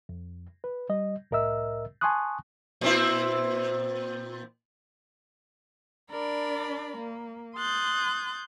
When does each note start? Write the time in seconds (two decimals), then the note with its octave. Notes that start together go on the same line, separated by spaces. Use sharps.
0.09 F2
0.64 B4
0.89 G3 D#5
1.31 C2 A2 A#4 D#5 E5 E6
2.01 G#5 A5 C6 C#6 D#6 F#6
2.81 A#2 C4 E4
6.11 D4 A#4 D5 B5
6.98 A#3
7.57 C6 D#6 F#6 G6 A6